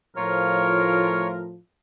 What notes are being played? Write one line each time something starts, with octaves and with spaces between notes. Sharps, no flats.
A2 F3 F4 A#4 C#5